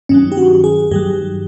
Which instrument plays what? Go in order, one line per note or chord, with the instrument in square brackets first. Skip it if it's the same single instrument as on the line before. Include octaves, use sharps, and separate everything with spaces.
[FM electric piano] G2 D#3 F#3 C#4
G4
F#4
G#4
G2 D#3 F#3 G4